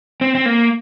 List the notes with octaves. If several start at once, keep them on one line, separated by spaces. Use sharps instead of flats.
C4
C4
A#3